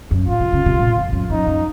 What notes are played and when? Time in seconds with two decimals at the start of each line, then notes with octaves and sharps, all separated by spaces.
0.11 F#2
0.27 A2 F4
0.40 C3
0.53 C#3
0.66 C3
0.79 A#2
0.96 F2
1.12 F#2
1.30 F#2 D#4
1.47 F#2